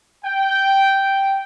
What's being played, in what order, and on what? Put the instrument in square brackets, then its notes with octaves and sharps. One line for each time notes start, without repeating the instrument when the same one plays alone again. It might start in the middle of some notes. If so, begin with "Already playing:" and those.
[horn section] G5